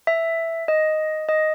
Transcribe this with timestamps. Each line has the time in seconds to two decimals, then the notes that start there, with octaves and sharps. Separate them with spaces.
0.07 E5
0.68 D#5
1.29 D#5